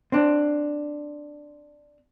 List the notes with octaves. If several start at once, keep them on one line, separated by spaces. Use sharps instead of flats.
C4 D4